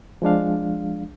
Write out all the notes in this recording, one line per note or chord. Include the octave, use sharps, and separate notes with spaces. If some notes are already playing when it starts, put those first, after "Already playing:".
F3 G#3 D4 F5